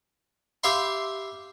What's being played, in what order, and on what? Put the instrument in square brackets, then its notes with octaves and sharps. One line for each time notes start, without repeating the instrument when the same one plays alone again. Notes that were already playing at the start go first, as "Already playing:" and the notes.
[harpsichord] G4 E5 F5 B5 C6